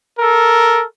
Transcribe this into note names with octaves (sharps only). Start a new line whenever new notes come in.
A4 A#4